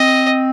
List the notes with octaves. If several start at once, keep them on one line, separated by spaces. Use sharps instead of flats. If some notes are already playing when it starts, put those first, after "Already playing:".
Already playing: C4 D#5